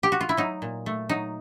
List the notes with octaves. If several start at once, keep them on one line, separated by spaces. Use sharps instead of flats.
G4
F#4
F4
E4
F#3 D#4
A#2
A3
F#3 D#4